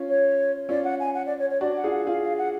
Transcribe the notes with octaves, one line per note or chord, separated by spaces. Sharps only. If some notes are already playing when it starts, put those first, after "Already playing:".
Already playing: C#4 F4
C#5
C#4 F4 D5
F#5
G#5
F#5
D5
C#5
C#5
D4 F#4 D5
F#5
F4 G#4
F#5
F4 G#4 F5
F5
F#5